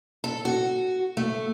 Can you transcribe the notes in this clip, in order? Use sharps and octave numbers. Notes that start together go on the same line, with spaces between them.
A4
F#4
A3